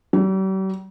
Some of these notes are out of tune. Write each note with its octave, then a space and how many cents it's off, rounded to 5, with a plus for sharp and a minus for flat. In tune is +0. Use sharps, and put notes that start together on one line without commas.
G3 -45